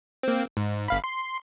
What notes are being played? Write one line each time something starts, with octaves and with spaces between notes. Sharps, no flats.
A#3 C4
G#2
G1 F5 B5
C6